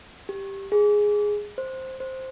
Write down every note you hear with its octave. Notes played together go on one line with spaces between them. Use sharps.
G4
G#4
C5
C5